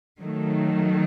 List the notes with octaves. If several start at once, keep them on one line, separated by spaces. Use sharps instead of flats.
D#3 F#3 A3